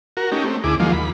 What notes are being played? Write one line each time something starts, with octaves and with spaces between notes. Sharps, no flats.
F#4 A#4
A3 C#4 D#4 G4
A3 C4
D2 E4 G#4 D6
D#3 F3 F#3 G#3 A#3 F4
D#2 B5